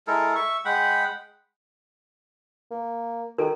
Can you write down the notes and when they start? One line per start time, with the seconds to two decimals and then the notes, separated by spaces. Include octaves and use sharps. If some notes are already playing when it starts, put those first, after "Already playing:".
0.07 G#3 E4 A4 A#4
0.35 E5 C#6
0.65 G#3 F#5 G5 B5
2.71 A#3
3.38 D#3 A4 A#4